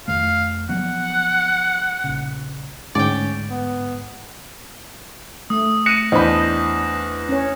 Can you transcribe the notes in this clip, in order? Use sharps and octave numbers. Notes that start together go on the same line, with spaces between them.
F2 D#3 A3 F5
F3 F#3 B3 F#5
A#1 C#3
D2 G#2 C#4 D5 G5
B3
A3 D#6
F#6 A#6 C#7 D#7 E7
E2 D4 C5 D#5 B5
C#4 C#5